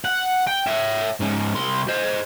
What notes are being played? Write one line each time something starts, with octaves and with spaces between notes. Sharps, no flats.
F#5
G5
C#5 E5
G#2 C#4
C2 C6
C5 D#5